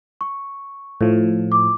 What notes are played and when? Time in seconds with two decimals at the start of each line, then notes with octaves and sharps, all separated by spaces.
0.21 C#6
1.01 A2 F3
1.52 D6